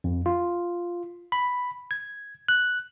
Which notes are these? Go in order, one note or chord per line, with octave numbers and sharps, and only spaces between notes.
F2
F4
B5
G#6
F#6